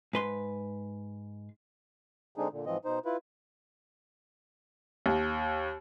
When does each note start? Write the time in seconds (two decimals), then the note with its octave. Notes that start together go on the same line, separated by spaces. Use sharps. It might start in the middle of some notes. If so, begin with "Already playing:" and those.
0.13 G#2 B4 C6
2.36 D3 G#3 C4 D4 D#4 G#4
2.52 A#2 D3
2.66 G#2 E3 F3 C4 D#5
2.85 B2 D#4 C5
3.05 E4 F4 B4
5.06 D#2